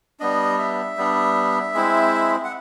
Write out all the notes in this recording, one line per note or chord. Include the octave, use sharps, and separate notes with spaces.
G3 B3 D4 D#5
E5
G3 B3 D4
G#3 C4 E4
F#5